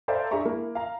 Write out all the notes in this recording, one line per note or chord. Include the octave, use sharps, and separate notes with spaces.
A4 C5 D5 E5 F5 A#5
D4 G#4 E5 A#5 C#6
A#3 E4
F5 A#5